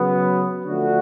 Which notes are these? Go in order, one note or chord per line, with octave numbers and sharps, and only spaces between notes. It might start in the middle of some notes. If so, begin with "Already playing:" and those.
Already playing: C#3 F#3 B3
D3 F3 A3 D4 F#4